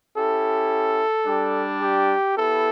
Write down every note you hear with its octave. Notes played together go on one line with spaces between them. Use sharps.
C#4 E4 G4 A4
G3 D4 G4
G4
B3 E4 G4 A4